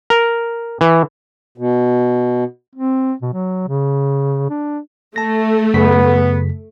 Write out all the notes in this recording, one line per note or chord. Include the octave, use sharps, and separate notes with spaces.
A#4
E3
B2
C4
B2
F#3
C#3
D4
A3 A5 A#6
F#2 C#3 B3 B6